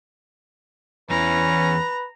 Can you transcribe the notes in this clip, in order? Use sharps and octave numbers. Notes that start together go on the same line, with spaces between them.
E2 E3 C#4 B4 A#5